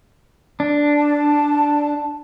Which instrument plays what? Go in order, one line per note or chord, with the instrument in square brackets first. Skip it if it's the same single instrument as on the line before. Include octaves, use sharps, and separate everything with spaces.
[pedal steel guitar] D4
[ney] A5